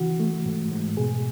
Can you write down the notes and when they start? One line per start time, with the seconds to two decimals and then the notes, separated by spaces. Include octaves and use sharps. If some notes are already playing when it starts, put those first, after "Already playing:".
Already playing: C#3 E3 F#4
0.20 A3
0.46 G#2
0.72 G#2
0.97 B2 G#4